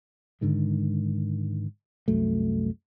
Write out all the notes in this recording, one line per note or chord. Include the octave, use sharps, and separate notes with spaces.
G#2 D3 D#3 G#3
C2 F#2 F#3 A3